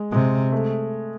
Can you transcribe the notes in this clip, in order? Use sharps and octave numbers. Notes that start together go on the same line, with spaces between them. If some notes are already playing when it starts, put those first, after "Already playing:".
Already playing: G#3
C3 G#3
A3